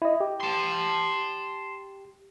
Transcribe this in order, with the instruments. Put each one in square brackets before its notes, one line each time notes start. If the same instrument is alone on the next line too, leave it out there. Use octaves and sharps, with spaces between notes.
[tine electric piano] E4 D#5
G4
[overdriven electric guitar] A5 C6